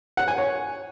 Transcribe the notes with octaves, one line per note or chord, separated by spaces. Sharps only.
F#5
G#5
C#5